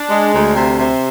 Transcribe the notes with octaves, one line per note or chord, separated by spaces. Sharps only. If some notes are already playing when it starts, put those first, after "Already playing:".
Already playing: D4
G#3
D2
C3
C3